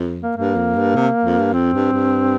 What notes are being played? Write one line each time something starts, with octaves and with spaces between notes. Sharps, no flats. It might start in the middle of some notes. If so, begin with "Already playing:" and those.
Already playing: F2
A#3
G2 A#3
F2
G2
C3
F2
G2
F2 C4
G2
G2